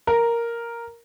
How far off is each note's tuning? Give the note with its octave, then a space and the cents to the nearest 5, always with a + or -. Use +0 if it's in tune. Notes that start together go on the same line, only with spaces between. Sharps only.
A#4 +0